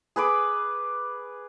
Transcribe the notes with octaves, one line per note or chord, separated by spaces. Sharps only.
G#4 B4 B5 D6